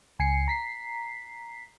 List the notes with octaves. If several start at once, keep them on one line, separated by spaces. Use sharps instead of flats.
C#2 G#5 C7 C#7
A#5 B6 C7